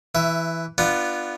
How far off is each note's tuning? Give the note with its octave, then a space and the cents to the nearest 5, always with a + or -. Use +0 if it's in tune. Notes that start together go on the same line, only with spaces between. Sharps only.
E3 +0 E5 +25
B3 +0 D4 +25 F4 -10